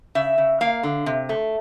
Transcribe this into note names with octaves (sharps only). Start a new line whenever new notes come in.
C#3 E5
C#3
A#3 F5
D3
C3
A3